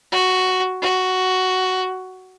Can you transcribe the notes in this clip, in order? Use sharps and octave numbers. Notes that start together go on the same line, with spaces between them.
F#4
F#4